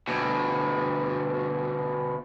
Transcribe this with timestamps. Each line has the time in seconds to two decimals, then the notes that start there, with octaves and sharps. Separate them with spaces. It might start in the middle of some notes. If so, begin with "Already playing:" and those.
0.07 D2 B2